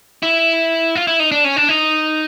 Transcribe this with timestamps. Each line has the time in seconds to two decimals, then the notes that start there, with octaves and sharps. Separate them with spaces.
0.23 E4
0.95 F4
1.07 E4
1.20 D#4
1.32 D4
1.44 C#4
1.57 D4
1.69 D#4